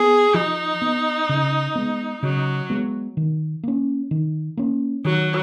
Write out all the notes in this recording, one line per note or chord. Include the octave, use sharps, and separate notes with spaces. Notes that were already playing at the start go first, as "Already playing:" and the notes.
Already playing: B3 G#4
F3 D#4
B3
C#3
G#3 B3
C#3 F#3
G#3 B3
D#3
A#3 C#4
D#3
A#3 C#4
D#3 F#3